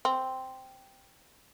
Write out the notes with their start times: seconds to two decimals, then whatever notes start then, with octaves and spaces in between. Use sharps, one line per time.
0.05 C4